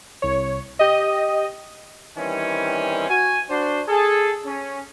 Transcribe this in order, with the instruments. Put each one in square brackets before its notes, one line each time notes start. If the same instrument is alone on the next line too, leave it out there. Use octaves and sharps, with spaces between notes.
[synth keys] C2 C#5
G4 D#5
[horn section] D#3 E3 G3 C4 C#4
F#4 G#5
D4 F#4 C5
G#4 A4
C#4